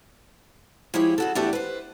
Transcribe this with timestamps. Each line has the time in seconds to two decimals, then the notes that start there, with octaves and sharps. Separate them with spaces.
0.94 F3 G#3 E4 G4 G#4 C#5
1.18 C#3 F#4 A4
1.35 E2 A3 D4 F#4 G4 E5
1.53 B4 C5